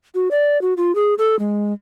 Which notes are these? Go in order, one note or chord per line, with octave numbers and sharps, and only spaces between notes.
F#4
D5
F#4
F4
G#4
A4
G#3